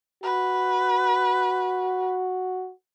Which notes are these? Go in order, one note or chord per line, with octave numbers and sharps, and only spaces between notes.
F#4 B4